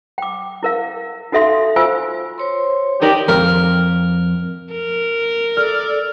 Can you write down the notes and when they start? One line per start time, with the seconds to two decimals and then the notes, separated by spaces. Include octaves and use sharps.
0.18 G5 D6
0.63 E4 A#4 F5
1.32 D#4 F#4 A4 E5 F5 C6
1.76 F4 C5 F5 G#5 E6
2.38 C5 C#5 C6
3.02 D#4 G4 A#4 D5
3.28 F2 A#4
4.71 A#4
5.57 A4 D5 F6